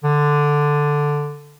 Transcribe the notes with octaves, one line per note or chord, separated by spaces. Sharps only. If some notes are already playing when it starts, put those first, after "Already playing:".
D3